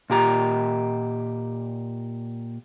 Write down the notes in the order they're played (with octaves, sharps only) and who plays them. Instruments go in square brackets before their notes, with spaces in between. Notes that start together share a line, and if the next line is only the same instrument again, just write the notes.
[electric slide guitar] A#2 G4 A#5